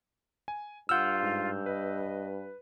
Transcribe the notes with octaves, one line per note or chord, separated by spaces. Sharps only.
G#5
G2 F4 F#5 E6 F6 G6
G#2
B4 D#5